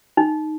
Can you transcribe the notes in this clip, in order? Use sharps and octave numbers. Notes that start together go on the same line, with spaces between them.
D#4